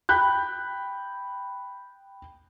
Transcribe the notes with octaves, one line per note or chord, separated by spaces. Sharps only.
G5 B5 F#6 G6